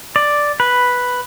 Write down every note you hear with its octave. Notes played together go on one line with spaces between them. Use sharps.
D5
B4